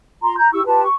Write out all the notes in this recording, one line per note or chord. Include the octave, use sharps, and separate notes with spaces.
F4 A#5 C6
A#5 G6
E4 G4 C#6 E6
F4 G4 B4 A5
C#6